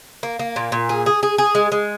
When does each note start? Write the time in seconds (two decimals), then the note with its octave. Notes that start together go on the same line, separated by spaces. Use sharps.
0.23 A#3
0.39 A#3
0.56 A#2
0.72 A#2
0.89 G#4
1.06 G#4
1.23 G#4
1.38 G#4
1.55 G#3
1.72 G#3